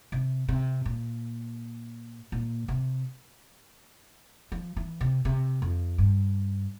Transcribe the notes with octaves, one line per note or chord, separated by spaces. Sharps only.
C3
C3
A#2
A#2
C3
F3
E3
C3
C3
F2
G2